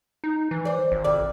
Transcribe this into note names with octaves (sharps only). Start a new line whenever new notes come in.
D#4
E3
C5 D5
G#1
F2 C3 D5